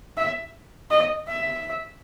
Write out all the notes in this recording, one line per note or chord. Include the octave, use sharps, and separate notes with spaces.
E5
D#5
E5